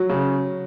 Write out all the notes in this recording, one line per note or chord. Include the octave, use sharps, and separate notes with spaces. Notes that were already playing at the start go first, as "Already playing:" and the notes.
Already playing: F#3
C#3